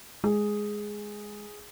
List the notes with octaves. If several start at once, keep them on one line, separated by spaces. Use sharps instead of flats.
G#3 G#4